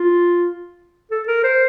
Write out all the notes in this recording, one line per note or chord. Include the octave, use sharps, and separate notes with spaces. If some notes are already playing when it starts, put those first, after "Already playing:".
Already playing: F4
A4
A#4
C5